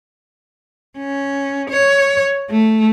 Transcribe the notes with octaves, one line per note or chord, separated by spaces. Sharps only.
C#4
C#5
A3